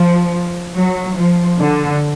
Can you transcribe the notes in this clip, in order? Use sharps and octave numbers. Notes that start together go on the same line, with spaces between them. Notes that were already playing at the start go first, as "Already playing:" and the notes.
Already playing: F3
F#3
F3
D3